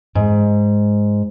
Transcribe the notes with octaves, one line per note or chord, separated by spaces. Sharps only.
G#2